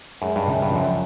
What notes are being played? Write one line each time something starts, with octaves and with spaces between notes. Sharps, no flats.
F#2 G#3
G2
C#2 F#2
G2
F3
F#2